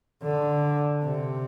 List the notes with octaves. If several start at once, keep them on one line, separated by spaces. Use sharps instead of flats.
D3
C3